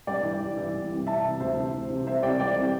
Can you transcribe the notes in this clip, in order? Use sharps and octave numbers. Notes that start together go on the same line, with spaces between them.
G2 D5 G5
E3
G2
E3
C2
C3 E3
C2 E5 A5
C3 E3
D2 C5 E5
C3 E3
D2
C3 E3
C2 C5 E5
C3 E3 D5 G5
C2 D5 G5
C3 E3